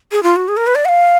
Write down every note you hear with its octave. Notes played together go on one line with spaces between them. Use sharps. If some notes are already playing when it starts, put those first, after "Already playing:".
G#4
F4
F#4
G#4
A#4
B4
D5
F#5
F5